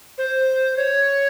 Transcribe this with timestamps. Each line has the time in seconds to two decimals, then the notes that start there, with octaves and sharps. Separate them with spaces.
0.18 C5
0.77 C#5